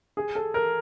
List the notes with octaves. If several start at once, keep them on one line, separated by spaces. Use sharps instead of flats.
G#4
A4
A#4